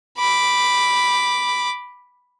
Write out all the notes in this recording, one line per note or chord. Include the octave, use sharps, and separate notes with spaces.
B5 D6